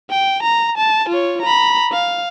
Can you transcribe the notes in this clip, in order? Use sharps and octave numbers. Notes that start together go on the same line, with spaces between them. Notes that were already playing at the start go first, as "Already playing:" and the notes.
G5
A#5
A5
F4 C#5
A#5 B5
F5